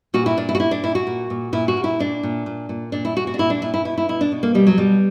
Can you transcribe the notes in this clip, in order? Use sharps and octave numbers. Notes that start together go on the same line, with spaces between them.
A#2 F#4
E4
A#2 D4
E4
F#4
A#2 E4
D4
A#2 E4
F#4
A#2
A#2
A#2 E4
F#4
A#2
E4
A#2 D4
A#2
A#2
A#2
A#2 D4
E4
A#2 F#4
F#4
D4
A#2 E4
D4
A#2 E4
E4
B2 E4
E4
B2 E4
D4
B2
A#3
B2 G3
F#3
B2 G3